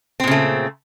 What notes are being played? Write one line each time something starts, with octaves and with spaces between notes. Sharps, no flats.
A#2 C#3 A3 C4